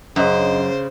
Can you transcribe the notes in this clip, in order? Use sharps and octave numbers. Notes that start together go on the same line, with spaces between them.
F#2 C#3 D4 C5 D#5